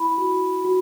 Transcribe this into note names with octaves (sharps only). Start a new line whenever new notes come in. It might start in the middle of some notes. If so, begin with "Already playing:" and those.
Already playing: E4 B5
F#4
F#4